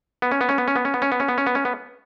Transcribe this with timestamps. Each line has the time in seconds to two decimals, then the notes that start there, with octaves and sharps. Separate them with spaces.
0.22 B3
0.31 C#4
0.41 B3
0.49 C#4
0.58 B3
0.68 C#4
0.76 B3
0.85 C#4
0.94 B3
1.02 C#4
1.12 B3
1.20 C#4
1.28 B3
1.38 C#4
1.47 B3
1.55 C#4
1.65 B3